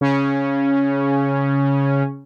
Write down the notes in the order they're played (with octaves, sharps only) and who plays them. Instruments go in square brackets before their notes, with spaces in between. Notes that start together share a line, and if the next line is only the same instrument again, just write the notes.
[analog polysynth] C#3 C#4